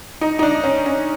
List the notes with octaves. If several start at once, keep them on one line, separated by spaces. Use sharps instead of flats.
D#4
D#4
D4
C#4
C#4